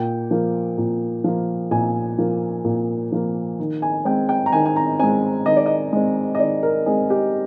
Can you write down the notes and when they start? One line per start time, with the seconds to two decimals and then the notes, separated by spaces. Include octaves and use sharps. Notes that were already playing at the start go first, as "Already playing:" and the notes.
Already playing: A#2 G5
0.31 F3 A#3
0.78 A#2
1.24 F3 A#3
1.71 A#2 G#5
2.18 F3 A#3
2.65 A#2
3.12 F3 A#3
3.59 D#3
3.82 G#5
4.05 G#3 C4 G5
4.29 G5
4.46 A#5
4.52 D#3 G#5
4.66 G#5
4.76 A#5
4.99 G#3 C4 G#5
5.46 D#3 D#5
5.57 D5
5.66 D#5
5.93 G#3 C4
6.35 D#5
6.40 D#3 D5
6.63 A#4
6.86 G#3 C4 G#4
7.10 G4